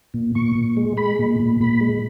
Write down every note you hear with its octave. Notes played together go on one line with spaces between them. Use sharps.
A#2
A#2 C#6
A#2
G#3
G#3 B5
A#2
A#2
A#2 B5
G#3